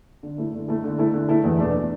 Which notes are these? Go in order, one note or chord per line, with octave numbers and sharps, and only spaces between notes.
D3
A3 E4 A4
D3
A3 E4 A4
D3
A3 E4 A4
D3
A3 E4 A4
E2
B2 A3 D4 A4